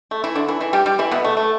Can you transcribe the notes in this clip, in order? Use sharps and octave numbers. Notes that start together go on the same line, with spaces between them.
A3
E3 E4
D3 D4
E3 E4
E3 E4
G3 G4
G3 G4
E3 E4
B2 B3
A3
A3